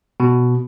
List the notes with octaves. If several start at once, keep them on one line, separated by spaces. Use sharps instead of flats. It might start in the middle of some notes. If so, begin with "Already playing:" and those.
B2